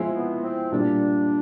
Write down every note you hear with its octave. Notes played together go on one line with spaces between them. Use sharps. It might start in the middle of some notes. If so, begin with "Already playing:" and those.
Already playing: F3 G#3 C4 E4 G#4
B3
C4
A#2 G3 A#3 D4